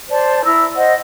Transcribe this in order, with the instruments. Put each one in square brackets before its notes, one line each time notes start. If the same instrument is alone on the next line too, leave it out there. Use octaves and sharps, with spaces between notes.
[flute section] C5 D5 A5
E4 A#5 E6
C5 D#5 F#5